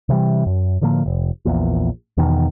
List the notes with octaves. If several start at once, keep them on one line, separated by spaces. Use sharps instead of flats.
C3 E3 G3
F#2
A2 D3 F3 A#3
F1
A#1 E2 A#2
E2 B2 D#3